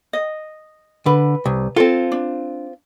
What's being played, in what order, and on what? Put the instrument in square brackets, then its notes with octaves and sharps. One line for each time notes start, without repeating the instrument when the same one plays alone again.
[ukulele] D#5
[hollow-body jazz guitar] D3 [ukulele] B4
[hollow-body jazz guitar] C2
[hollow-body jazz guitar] C4 F4 [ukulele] A4
[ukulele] D4